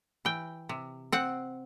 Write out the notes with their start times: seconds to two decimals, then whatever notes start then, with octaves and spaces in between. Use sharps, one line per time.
0.25 E3 G5
0.69 C3
1.12 C4 F#5